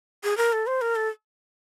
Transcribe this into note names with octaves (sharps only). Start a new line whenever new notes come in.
G#4
A#4
A4
C5
A#4
A4